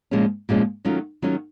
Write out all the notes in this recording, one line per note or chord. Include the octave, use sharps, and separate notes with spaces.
A#2 F3 G#3 C#4
A#2 F3 G#3 C#4
D#3 F#3 A3 C#4 F4
D#3 F#3 A3 C#4 F4